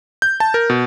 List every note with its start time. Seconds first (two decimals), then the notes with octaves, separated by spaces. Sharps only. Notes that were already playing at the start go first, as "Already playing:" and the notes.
0.22 G6
0.40 A5
0.54 A#4
0.70 B2